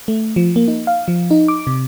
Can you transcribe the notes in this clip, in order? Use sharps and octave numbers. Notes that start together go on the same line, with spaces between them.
A3
F3
A#3
D#4
F5
F3
D#4
D6
C3